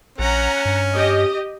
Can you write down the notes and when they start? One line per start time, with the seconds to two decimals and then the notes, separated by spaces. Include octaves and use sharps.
0.19 A#1 C#4 F#5 A#5
0.65 G2
0.94 G4 D#5